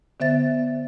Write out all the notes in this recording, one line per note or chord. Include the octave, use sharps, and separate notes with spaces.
D3 B3 C5 E5 A6